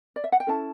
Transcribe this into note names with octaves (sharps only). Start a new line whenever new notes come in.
D5
E5
F#5
G5
C#4 E4 A4 A5